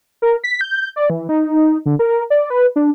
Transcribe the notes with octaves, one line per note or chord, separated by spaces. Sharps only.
A#4
B6
G6
D5
E3
D#4
D3
A#4
D5
B4
D4